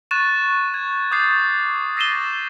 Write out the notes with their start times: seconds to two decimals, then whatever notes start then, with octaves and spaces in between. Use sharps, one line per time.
0.11 C#6 F#6 A6 D#7 E7
0.74 G#6
1.11 D6 D#6 G6 A6 C7
1.96 E6 A#6 C7 D#7 E7 G7
2.12 A6 G7